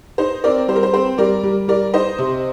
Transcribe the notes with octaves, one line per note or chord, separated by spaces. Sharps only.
D#4 C5
C4 A#4 D5
G3 C5
A#4
C5
C4 C5
G3 A#4 D5
G3
G3 A#4 D5
D#4 C5 D#5
C3